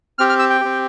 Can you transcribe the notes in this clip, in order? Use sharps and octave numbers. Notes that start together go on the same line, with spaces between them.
C4 G4 F6
F6
E6
G5
C4 G4